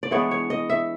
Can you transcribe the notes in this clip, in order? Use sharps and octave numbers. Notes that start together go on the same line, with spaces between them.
D5
E3 G#3 B3 D4 C#5
C#5
D#5
E5